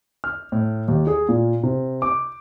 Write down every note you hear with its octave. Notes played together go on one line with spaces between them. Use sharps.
F6
A2
D#2
G#4
A#2
C3
D6